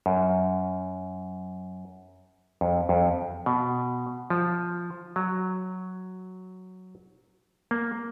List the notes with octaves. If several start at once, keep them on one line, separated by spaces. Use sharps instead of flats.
F#2
F2
F2
B2
F3
F#3
A#3